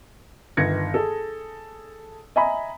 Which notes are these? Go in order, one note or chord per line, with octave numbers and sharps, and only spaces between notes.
G1 D#3 B4 G#6 A#6 C#7
G#4 A4
D#5 E5 G#5 A#5 B5